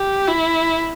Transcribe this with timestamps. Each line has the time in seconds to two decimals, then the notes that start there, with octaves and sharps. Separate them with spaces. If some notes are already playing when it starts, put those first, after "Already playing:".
Already playing: G4
0.28 E4